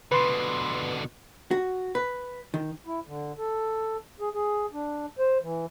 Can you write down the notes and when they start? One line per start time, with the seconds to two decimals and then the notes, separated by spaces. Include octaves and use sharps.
0.12 B2 D3 B4 C6
1.51 F#4
1.95 B4
2.54 D#3
2.86 E4
3.07 D3
3.38 A4
4.20 G#4
4.34 G#4
4.73 D4
5.19 C5
5.42 E3